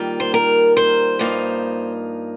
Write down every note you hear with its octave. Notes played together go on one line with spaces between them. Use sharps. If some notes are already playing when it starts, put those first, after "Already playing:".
Already playing: D#3 G3 A#3 F4
C5
A#4
C5
G2 F3 A#3 D#4